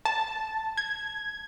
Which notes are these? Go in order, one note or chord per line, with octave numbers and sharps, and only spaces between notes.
A5
G#6